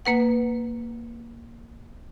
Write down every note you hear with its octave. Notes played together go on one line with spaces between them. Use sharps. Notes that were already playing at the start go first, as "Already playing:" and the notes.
A#3 B4 F#5